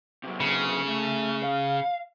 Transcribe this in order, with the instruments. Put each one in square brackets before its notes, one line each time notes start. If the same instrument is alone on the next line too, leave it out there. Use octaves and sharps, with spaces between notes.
[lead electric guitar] C3 F#3
[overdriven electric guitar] C#3
[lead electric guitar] A3
F5